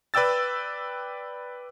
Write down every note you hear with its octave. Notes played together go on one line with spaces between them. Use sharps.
B4 D5 G5 E6 A6